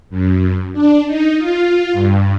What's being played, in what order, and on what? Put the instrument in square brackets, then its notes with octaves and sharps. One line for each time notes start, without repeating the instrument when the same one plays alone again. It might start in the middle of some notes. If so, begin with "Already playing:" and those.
[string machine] F#2
D4
D#4
F4
G2